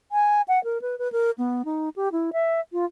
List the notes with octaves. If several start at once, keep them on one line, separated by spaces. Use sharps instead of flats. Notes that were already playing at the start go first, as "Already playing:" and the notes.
G#5
F#5
A#4
B4
B4
A#4
B3
D#4
G4
E4
E5
F4